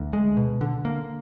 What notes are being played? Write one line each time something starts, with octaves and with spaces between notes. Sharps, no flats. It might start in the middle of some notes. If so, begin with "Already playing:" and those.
Already playing: D2
G#3
B2
D3
A#3